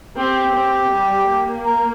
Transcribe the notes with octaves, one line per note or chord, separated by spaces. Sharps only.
C4 G4
C4
G3
A#3
A#4